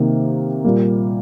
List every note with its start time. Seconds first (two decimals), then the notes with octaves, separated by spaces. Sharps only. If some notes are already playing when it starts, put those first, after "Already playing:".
Already playing: C3 D#3 A#3
0.64 A#2 G3 A#3